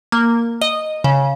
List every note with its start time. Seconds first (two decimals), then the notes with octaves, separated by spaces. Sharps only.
0.12 A#3
0.62 D#5
1.04 C#3